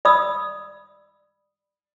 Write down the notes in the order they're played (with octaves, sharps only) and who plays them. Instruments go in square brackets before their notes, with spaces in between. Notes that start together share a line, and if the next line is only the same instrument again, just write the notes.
[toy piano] D5 B5 D#6 E6